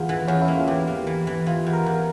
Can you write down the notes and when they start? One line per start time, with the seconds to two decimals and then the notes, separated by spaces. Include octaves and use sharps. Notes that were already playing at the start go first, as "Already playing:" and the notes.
Already playing: E2 F4 G#4
0.09 E3
0.28 E2 C#4
0.42 E4
0.48 A#3
0.55 F4
0.67 E3 G4
0.87 A#3
1.07 E3
1.27 E3
1.46 E3 F4
1.66 E2
1.73 A#4
1.86 E2